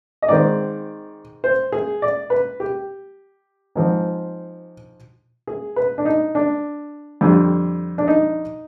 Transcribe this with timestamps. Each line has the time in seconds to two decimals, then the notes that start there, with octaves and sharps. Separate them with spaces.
0.22 D#5
0.28 G#2 D#3 G#3 C4 D5
1.44 C5
1.72 G#4
2.02 D5
2.30 B4
2.60 G4
3.75 G#2 F3 C4
5.47 G#4
5.76 B4
5.98 D4
6.05 D#4
6.35 D4
7.21 F2 D3 G3
7.98 D4
8.07 D#4